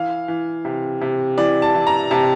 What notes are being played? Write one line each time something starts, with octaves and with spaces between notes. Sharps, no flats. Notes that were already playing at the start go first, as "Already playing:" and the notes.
Already playing: E3 F5
E3
C3
C3
E3 D5
A5
E3
A#5
C3 A5